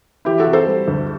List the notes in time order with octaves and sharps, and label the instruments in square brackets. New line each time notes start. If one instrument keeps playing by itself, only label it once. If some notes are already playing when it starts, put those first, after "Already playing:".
[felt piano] E3 E4 G4
F#4 A4
C3
A4 C5
G3
D2